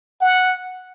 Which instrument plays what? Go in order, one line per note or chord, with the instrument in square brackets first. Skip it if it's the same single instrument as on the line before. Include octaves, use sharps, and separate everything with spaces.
[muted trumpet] F#5